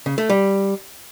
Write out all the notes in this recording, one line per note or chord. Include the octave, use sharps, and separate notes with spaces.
C#3
A3
G3